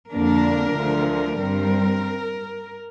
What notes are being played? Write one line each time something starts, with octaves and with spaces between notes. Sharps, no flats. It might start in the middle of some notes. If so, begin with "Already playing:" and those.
F2 D3 A#3 D4 A#4
D2 D3 F3
G2 G3 C4 A#4